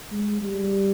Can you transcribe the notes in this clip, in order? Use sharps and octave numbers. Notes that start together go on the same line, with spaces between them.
G#3
G3